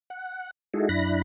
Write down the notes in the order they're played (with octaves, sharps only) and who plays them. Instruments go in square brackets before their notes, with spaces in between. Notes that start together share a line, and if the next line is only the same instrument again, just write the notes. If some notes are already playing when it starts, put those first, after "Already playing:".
[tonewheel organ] F#5
G#3 D#4 E4 F#4 G#4 A4
F#2 D4 E4 B5 F#6 A#6